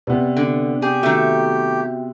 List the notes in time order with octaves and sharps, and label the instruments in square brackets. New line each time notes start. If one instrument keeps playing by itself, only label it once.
[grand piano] C3 B3 [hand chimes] B4 D5
[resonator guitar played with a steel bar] D3
[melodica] G4 [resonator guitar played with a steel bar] G#4
[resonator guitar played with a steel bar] D#3 A3 [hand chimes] F#4 E5 G5